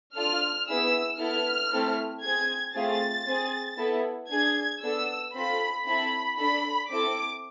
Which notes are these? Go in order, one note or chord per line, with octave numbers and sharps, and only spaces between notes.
D4 F4 A4 F6
B3 E4 G#4 E6
B3 E4 A4 F6
A3 C4 E4 A4
C4 G#4 G#6
A3 C4 F4 G#4 A6
C4 G#4
B3 E4 A4
D4 G#4 G#6
B3 D4 A4 E6
C4 F4 A4 B5
C4 E4 A4 B5
D4 A4 B5
C4 E4 A4 D6